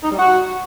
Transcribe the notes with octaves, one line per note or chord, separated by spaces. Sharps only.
D#4
G3
F#4